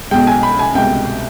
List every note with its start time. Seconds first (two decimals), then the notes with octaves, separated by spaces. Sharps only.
0.11 B1 B2 G#3 G5
0.27 G#5
0.43 B5
0.59 G#5
0.75 C2 B2 G#3 G5